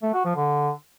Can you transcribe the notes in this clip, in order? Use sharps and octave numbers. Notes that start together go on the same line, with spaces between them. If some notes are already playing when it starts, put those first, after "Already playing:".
A3
F#4
F3
D3